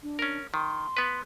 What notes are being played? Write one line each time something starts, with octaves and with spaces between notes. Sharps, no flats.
D4
C#4 A#4
D#3 C6
B3 B4